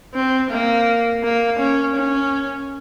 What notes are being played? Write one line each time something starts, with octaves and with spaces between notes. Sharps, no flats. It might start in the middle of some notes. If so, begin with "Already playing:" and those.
C4
A#3
A#3
C#4
C#4